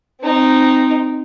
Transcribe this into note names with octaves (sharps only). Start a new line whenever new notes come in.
C4 D#4